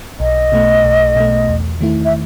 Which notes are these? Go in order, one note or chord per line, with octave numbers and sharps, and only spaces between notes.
B1 D#5
B2 A3
B1
B2 A3
E2
D#3 A3 E4
E5